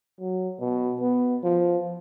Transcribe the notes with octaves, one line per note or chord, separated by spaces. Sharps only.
F#3
B2
B3
F3